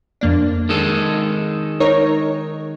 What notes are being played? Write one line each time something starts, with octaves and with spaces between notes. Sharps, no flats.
F2 A#3 D4
D#3 G#3 A4
D#4 A#4 C#5